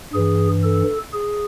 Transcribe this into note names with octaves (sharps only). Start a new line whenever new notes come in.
G2 E3 G#4
A4
G#4